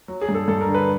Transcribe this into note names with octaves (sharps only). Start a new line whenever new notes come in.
F#3
G#4
G2
A4
G2 A4
A#4
D3
B4